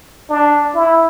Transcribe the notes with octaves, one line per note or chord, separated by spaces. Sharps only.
D4
E4